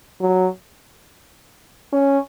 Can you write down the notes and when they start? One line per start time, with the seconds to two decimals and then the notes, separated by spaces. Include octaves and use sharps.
0.21 F#3
1.93 C#4